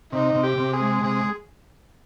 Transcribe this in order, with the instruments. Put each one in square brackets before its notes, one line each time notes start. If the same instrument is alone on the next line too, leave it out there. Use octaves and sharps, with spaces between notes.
[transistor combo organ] C3 [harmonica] D#4
[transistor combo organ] C3
[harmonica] G4
[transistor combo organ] C3
[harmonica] G#4
[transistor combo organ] G#3
[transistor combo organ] C3 [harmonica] G#4